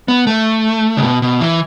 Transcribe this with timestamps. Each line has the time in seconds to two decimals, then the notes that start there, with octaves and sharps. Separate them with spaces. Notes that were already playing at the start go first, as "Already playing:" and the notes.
0.08 B3
0.27 A3
0.97 C#3
1.03 B2
1.22 B2
1.41 E3